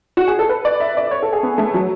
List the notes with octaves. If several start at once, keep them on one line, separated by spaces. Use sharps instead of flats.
F#4
G#4
A4
B4
D5
E5
D5
C#5
A4
G#4
B3
A3
F#3